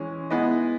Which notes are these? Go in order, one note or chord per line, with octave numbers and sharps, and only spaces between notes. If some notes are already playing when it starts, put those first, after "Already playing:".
Already playing: E3 G#3 C#4 G#4
G#3 B3 E4 G#4 D#5